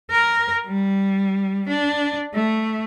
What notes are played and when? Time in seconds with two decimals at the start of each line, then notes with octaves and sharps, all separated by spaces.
0.10 A#4
0.66 G3
1.69 D4
2.34 A3